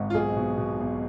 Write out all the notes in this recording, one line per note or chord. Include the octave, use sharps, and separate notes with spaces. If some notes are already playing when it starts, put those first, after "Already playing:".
Already playing: G#1 G#2
F4
B1 G#4
B2
B2
B1